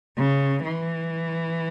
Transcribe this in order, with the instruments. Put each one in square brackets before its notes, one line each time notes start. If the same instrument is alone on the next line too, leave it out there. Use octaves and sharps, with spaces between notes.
[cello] C#3
E3